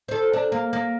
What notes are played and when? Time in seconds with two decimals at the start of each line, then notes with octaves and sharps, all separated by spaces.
0.08 A4 C5
0.33 D4
0.52 A#3
0.73 A#3